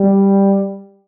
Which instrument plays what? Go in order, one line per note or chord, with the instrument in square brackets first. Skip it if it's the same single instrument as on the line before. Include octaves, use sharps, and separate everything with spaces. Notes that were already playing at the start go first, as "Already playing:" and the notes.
Already playing: [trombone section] G3